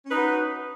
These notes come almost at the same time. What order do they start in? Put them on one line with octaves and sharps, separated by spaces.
C#4 B4 D#4 F#4